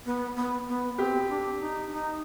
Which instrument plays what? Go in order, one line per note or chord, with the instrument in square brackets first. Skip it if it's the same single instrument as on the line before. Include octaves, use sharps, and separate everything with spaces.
[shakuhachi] B3
B3
B3
[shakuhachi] C4 [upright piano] G4
[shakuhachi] D4
D#4
D#4